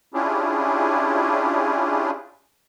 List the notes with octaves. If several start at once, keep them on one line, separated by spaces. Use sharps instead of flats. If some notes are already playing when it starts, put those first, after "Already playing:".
C#4 D4 E4 F4 G4 G#4